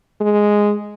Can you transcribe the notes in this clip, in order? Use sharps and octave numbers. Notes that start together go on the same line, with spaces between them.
G#3